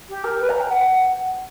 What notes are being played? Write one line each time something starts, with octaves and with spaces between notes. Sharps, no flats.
G4
A#4
B4
A#5
G5
F#5